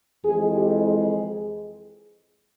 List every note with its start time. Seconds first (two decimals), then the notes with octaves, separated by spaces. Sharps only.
0.24 F2 E3 G#3 G#4
0.54 G4
0.85 G#4